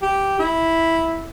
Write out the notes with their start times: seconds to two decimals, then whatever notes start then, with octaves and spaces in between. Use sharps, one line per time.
0.02 G4
0.39 E4